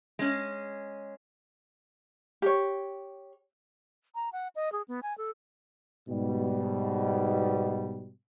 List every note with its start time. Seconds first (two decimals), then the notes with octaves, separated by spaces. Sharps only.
0.19 G#3 C#4
2.42 G4 C#5
4.15 A#5
4.33 F#5
4.56 D#5
4.72 G#4
4.88 B3
5.03 G#5
5.18 A4
6.09 G#2 B2 G3